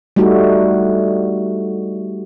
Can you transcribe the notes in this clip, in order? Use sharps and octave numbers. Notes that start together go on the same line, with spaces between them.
G3 A3 D#4 F#4